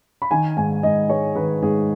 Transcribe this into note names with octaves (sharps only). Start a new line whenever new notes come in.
B5
D#3 G#5
G#2 G#5
G#2 D#5
G#3 C#5
D#3 B4
G#2 G#4